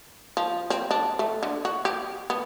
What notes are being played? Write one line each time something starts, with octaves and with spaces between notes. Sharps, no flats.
F3
C4
D4
A3
D3
F#4
G4
B3